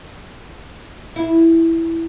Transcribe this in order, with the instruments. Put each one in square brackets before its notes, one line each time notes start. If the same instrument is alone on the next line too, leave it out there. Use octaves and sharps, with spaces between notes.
[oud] E4